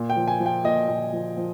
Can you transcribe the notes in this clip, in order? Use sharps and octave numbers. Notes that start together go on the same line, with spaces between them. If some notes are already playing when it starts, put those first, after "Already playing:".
Already playing: A#2
G5
F3
G#5
F3
G5
A#2 D#5
A#2
F3
F3